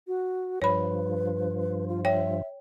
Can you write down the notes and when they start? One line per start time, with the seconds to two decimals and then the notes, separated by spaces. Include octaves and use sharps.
0.07 F#4
0.62 G2 F3 B4 C#5 B5
1.89 F4
2.05 C#5 E5 G5